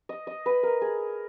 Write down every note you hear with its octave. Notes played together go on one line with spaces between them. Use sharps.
D#5
D#5
B4
A#4
G#4